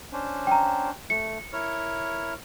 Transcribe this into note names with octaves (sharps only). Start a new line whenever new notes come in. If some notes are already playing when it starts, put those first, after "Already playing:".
C#4 D4 C5
G5 A#5
A3 C#7
E4 A#4 C#5